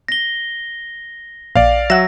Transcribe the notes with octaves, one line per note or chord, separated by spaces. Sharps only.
A#6 G7
A#1 D5 F5
F#3 E5 F#5 E6 A#6